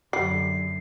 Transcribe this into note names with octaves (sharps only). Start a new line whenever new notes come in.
F#2 D3 G3 C7